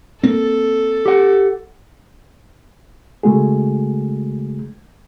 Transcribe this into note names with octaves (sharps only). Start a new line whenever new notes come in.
A#3 C4 A4
G4 F#5
C#3 G#3 A3 F#4 G#4